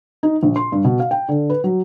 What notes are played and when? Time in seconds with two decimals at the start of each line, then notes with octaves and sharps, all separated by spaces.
0.23 D#4
0.43 A#1
0.56 C6
0.72 G2
0.84 B2
1.00 F5
1.11 G5
1.29 D3
1.50 B4
1.64 F#3